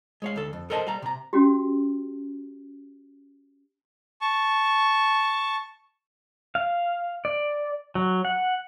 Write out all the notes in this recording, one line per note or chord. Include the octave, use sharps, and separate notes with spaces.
G#3 C#5 F5
D2 A4
F2
A4 A#4 C5 D#5 G#5 A5
G3 F5 A#5
C3 A#5
C#4 F#4 G4
A5 C#6
F5
D5
F#3
F#5